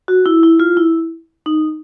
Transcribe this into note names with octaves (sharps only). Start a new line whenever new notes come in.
F#4
E4
E4
F4
E4
D#4